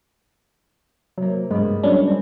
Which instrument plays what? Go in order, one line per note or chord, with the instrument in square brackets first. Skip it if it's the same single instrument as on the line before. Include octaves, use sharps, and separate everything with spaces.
[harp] C3 A#3 [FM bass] F#3
[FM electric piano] G2 [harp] G3 A#3 B3 [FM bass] G#3
[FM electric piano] F#3 C#4 D4 [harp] G#4
[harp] C4